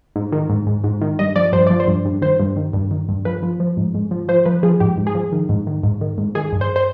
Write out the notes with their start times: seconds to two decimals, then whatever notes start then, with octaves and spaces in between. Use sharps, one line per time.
0.16 G#2
0.32 D#3
0.49 G#2
0.67 G#2
0.84 G#2
1.01 D#3
1.19 G2 D#5
1.36 F3 D5
1.53 G2 C5
1.67 F3 D5
1.80 C5
1.88 G2
2.05 G2
2.22 D#3 C5
2.40 G2
2.56 D#3
2.73 G2
2.91 D#3
3.09 G2
3.25 F3 B4
3.43 F3
3.60 F3
3.77 G#2
3.94 G#2
4.11 F3
4.28 F3 C5
4.46 F3 B4
4.63 F3 G#4
4.80 G#2 G4
4.98 G#2
5.07 G#4
5.15 F3
5.32 D#3
5.49 G#2
5.67 D#3
5.83 G#2
6.01 D#3
6.18 G#2
6.35 D#3 G#4
6.52 G2
6.61 C5
6.76 C5